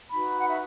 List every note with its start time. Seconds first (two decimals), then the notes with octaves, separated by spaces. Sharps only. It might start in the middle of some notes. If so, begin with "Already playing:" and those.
0.11 D#4 F#4 B4 B5
0.40 F#5
0.48 E5